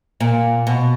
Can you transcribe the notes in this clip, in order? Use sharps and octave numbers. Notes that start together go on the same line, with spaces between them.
A#2
B2